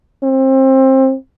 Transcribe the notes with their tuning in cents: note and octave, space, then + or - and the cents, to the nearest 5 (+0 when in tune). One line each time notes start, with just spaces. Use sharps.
C4 +25